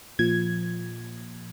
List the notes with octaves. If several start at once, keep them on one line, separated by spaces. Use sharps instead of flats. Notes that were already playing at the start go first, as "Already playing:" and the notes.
A#2 F3 G#6